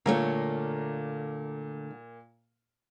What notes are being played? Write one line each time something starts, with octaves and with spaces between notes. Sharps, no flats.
A#2 D3 A3 C#5 F5 A#5